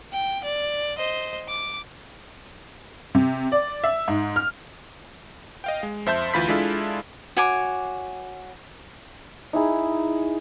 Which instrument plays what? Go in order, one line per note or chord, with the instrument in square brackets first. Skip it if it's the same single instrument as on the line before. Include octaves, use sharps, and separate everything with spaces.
[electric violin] G5
D5
C5 D#5
D6
[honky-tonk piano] C3
D5
E5
G#2
F6
[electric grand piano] D#5 F5 G5
G#3
F2 C5 E5 A5 C6 G6
D2 E3 F4 B5 B6
G#3 D4 E4 F4 A4
[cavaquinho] F#4 C#5 G#5 D6
[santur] D#4 E4 G#4